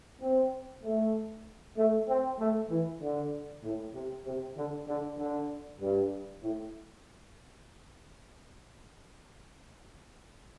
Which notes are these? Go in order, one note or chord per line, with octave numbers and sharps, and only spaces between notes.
C4
A3
A3
C4
A3
E3
D3
A2
C3
C3
D3
D3
D3
G2
A2